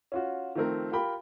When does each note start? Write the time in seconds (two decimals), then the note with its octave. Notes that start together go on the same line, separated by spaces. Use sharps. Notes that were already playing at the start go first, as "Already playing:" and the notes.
0.12 C#4 F4 F#4
0.55 D#3 F3 A3 C4 A#4
0.92 F4 G4 A#4 G5 B5